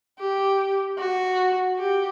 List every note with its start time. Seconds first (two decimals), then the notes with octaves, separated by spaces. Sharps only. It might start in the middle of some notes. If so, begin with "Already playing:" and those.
0.19 G4
0.99 F#4
1.79 G4